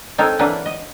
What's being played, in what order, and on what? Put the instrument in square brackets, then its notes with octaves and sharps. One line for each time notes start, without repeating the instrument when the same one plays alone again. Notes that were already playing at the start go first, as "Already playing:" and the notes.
[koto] C4 D#4 A4 A#4 C#5
E3 F#3 A#3 D4 B4 F#5
D#5